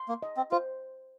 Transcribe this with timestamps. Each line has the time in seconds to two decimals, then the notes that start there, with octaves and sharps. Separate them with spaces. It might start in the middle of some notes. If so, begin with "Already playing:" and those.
Already playing: C6
0.09 A#3
0.22 D#5
0.37 C4
0.51 F4 C5